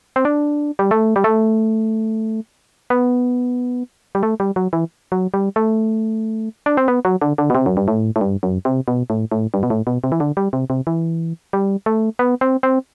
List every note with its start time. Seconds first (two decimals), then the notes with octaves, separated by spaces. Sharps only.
0.16 C4
0.25 D4
0.79 G3
0.91 A3
1.16 G3
1.24 A3
2.90 B3
4.15 G3
4.23 A3
4.40 G3
4.56 F#3
4.73 E3
5.12 F#3
5.34 G3
5.56 A3
6.66 D4
6.77 C4
6.88 B3
7.05 F#3
7.21 D3
7.38 D3
7.50 B2
7.55 C3
7.66 F#2
7.77 G2
7.88 A2
8.16 A2
8.21 G2
8.43 F#2
8.65 C3
8.88 B2
9.10 A2
9.32 A2
9.54 G2
9.63 B2
9.70 A2
9.87 B2
10.04 C3
10.12 E3
10.20 D3
10.37 G3
10.53 C3
10.70 C3
10.87 E3
11.53 G3
11.86 A3
12.19 B3
12.41 C4
12.63 C4